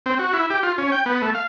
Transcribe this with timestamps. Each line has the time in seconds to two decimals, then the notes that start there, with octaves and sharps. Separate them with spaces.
0.06 C4
0.19 F#4
0.33 E4
0.50 G4
0.63 F4
0.78 C#4
0.92 G5
1.06 B3
1.22 A3
1.35 F5